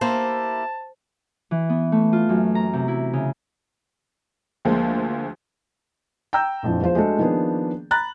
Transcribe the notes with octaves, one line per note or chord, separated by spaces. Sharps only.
A#3 E4 G4 C5 A5
E3
B3
A3
F4
F#2
A#5
C3
E4
C#3
D2 F3 G#3 A#3
G5 A#5 E6 G6
A#1 F2 E3 F3
E2 F3 F4 C5
G#3 A3 D4 F#4 A4
D#3 F3 A#3 B3 D4 G#4
A#5 B5 F#6 A6